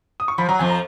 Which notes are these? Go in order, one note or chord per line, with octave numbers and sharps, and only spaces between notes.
D#6
C#6
F3 B5
F#3 A#5
F2 F3 G#5
A#5